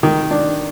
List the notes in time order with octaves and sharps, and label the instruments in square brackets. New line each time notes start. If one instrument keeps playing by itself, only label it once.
[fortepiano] D#3
D4